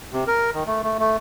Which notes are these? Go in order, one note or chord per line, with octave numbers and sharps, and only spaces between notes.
C3
A#4
D#3
A3
A3
A3